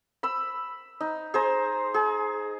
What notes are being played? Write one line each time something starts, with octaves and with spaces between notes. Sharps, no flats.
B5 E6
D#4
G#4 C5 A#5
G#4